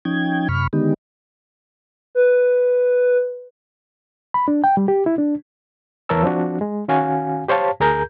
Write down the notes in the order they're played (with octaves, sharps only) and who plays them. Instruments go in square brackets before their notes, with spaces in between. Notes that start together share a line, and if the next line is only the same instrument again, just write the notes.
[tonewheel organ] F3 C#4 D#4 G5 G#6
F#2 C3 B5 C#6 F6
D3 D#3 G#3 B3 D#4 G4
[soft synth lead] B4
[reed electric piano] B5
D4
G5
G3
G4
E4
D4
E2 E3 A#4 C#5 A5 E6
F3 C4 D4 F#4
G#3
D#3 C#4 F#4 F5 G#5
G4 C5 C#5 F5 A5
D2 G#4 A#4 A#5 G6